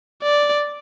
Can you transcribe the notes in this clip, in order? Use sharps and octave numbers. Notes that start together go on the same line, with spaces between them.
D5